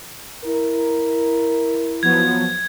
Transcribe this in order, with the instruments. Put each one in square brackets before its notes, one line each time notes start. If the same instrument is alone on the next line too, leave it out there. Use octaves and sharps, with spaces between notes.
[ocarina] E4 [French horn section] A#4
[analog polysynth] F3 F#3 B3 [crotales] G#6